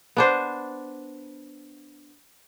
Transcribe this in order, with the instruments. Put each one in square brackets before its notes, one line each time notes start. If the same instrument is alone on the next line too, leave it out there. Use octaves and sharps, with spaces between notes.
[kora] B3 D4 C5